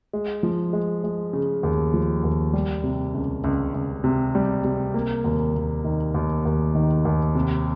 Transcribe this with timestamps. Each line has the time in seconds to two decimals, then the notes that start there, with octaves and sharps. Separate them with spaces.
0.13 G#3
0.43 F3
0.73 G#3
1.04 G#3
1.33 C#3
1.63 D#2
1.94 F3
2.24 D#2
2.53 G3
2.83 C3
3.15 C#2
3.44 C#2
3.74 C#2
4.04 C3
4.35 G3
4.64 C3
4.94 A#3
5.24 D#2
5.54 D#2
5.84 D#3
6.14 D#2
6.45 D#2
6.75 D#3
7.05 D#2
7.35 C3